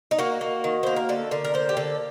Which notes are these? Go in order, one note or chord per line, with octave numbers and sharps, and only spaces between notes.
D#4
A#3 F#4
A#3
D#3
A#3 C5
A#4
D3 A4
D3 A#4
A#4
A#3 C5
G4
D3 A4